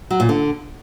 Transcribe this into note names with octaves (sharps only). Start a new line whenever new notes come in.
F#3
A#2
D3